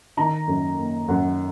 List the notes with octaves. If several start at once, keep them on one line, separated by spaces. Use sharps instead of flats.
D#3 A#5
F#2
A#3
F#2 F#5